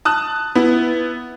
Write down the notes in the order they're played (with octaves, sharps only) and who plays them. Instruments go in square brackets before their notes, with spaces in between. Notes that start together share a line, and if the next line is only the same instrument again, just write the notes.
[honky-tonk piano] A5 D#6 F#6
B3 E4